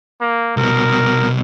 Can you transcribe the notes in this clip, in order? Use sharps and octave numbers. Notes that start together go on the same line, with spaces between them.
A#3
C2 B2 A#4